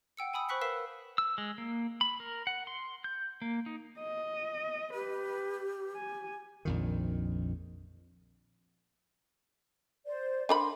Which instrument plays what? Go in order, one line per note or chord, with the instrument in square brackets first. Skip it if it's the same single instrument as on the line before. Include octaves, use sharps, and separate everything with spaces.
[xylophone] F#5 G5 E6 C#7
G#5 B5 D#6 E6
C5 B5 C#6 F#6 B6 C#7
A#4 B4 F5 E6 B6 E7
[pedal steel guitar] E6
G#3
A#3
B5
A#4
F#5
C6
G6
A#3
D#4
[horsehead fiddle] D#5
[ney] G4 [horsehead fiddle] B4
[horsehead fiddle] G#5
[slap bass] A#1 F2 D#3
[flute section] C5 D5
[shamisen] D4 A#4 B5 [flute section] C6